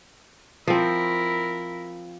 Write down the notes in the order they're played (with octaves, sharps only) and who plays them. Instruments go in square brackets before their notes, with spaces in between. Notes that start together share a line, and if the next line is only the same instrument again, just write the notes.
[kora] F3 C4 [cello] E4 A#4